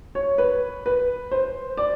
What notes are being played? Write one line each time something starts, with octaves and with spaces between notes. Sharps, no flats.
C#5
B4
B4
C5
D5